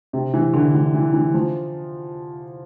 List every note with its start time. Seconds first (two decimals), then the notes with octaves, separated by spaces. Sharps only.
0.13 C3
0.34 E3
0.53 D3
0.75 E3
0.94 E3
1.13 E3
1.34 F3